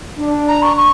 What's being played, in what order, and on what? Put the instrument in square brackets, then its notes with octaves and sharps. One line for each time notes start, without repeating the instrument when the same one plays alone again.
[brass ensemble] D4
[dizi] A#5
C#6
C#6